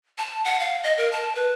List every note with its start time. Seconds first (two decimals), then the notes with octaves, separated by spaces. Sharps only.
0.18 A5
0.45 F#5
0.60 F5
0.83 D#5
0.98 A#4
1.12 A5
1.35 B4